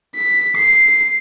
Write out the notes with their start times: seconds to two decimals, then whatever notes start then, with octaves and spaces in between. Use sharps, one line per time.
0.15 B6
0.55 C7